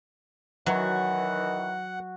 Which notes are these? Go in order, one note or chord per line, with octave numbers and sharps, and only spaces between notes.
D#3 E3 F#3 F#4 F#5 C#6